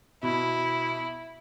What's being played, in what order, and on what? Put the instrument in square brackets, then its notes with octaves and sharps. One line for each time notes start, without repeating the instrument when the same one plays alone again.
[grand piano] B2 [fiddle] E4